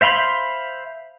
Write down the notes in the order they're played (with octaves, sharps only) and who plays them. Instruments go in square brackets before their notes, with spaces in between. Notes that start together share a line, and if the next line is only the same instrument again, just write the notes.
[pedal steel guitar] C5 E5 F5 B5 C6